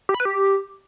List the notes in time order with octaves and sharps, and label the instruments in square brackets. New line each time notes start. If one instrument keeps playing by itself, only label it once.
[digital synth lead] G4
B5
B4
G4